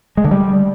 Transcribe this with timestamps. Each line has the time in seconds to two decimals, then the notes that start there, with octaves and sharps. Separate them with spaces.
0.17 G#3
0.24 D3
0.31 G3